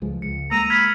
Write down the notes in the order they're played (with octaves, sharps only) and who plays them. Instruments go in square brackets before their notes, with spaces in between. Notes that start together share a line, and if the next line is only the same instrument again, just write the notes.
[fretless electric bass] C#2 F3 G#3
[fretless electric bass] C#2 [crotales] C#7
[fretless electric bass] G#3 A#3 [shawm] A#5 [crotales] E6 D#7
[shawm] B5 [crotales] F6 G#6 F7